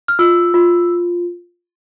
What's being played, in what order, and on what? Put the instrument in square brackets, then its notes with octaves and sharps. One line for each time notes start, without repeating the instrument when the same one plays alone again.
[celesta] F6
F4 E6
F4